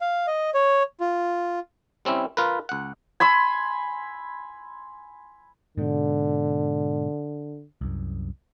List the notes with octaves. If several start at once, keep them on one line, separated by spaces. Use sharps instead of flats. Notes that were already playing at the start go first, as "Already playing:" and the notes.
F5
D#5
C#5
F4
G3 C4 C#4 E4
F4 A#4 B4
C#2 F#5
G#5 B5 C6 E6
G#2 B2 D3
C2 F#2